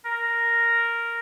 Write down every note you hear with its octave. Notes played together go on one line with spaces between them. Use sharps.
A#4